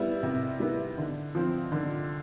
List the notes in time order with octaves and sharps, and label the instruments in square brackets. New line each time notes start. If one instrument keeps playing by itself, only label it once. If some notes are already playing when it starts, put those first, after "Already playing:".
Already playing: [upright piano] G3 B3 E4
C3
G3 B3 E4
D3
F3 C4
D3